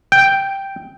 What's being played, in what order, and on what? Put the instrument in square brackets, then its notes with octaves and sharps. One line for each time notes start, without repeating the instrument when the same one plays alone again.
[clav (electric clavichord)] G5